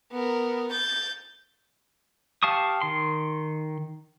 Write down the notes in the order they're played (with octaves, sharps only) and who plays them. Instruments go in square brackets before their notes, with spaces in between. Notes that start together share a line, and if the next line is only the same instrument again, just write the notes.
[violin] B3 A#4
G6 A6
[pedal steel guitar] G4 F5 A5 C#6 D#6
D#3 C6